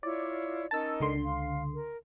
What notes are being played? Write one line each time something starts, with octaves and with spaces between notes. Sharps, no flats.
E4 F4 C#5 D5
C#4 D#4 A#4 A5 E6
C#2 D3 C6
F5
A#4